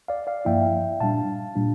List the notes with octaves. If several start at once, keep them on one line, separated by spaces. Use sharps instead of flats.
D5 F5
D5 F5
G2 F3 A#3 E4 E5 G5
A#2 G3 D4 F5 A5
A#2 G3 D4